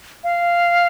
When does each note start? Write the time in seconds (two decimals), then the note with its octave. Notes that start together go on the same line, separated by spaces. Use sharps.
0.24 F5